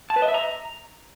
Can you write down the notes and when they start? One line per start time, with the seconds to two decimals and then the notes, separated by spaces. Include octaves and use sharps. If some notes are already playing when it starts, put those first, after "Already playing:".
0.10 A5
0.16 B4
0.22 D#5
0.28 E5
0.34 A#5